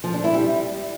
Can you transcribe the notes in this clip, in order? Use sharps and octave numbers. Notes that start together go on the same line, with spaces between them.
F3
D4
E4
G3